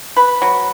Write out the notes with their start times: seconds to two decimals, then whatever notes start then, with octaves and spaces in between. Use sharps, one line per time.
0.17 B4
0.42 F#3